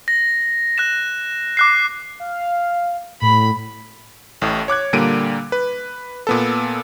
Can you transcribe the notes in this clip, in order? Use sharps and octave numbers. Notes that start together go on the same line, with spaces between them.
A#6
F#6 A#6 E7
D6 F#6 C7
F5
A2 B5
A1 A2
C#5 D6 F#6 G#6
A#2 D3 G3 A#3 D7 D#7
B4
A#2 B3 A4